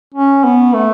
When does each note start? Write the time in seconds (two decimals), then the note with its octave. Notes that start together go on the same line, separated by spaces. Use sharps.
0.14 C#4
0.44 B3
0.74 A3